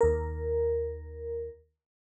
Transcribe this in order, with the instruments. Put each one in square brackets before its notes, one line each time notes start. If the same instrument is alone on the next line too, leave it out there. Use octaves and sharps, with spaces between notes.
[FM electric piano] D#2 A#4